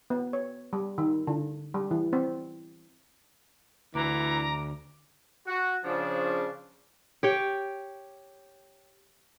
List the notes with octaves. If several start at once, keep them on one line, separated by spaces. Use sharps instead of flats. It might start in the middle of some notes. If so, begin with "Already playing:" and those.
B3
C#5
G3
D#3
D3
G3
E3
C4
D2 E3 A#5 D6
F#4
C#3 F3 D4
G4 C#5 G5